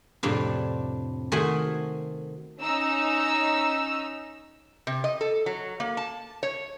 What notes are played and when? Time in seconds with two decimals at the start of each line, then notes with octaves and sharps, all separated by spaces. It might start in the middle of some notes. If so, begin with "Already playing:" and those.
0.23 F2 A2 C3 D4
1.32 D#3 A3 F#4 C5 G#5 C6
2.60 C#4 D#4 E6
4.87 C3
5.04 D#5
5.21 A4
5.46 F#3
5.80 A#3
5.97 A5
6.43 C#5